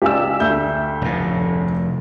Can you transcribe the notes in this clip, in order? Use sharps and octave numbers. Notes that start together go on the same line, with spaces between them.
C#2 G4 D5 G#5 E6
D2 E5 G6
F1 A2